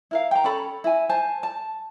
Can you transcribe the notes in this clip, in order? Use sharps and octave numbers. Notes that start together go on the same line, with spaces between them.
E4 A#4 F5
G5 A#5
C#4 A4 B5
E4 G#5
C5 G#5 A5
A5